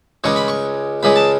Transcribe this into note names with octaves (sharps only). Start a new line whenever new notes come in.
C#2 C#3 G#3 C#4 C#6
B5
C#6
C#2 C#3 G#3 C#4 B5
A5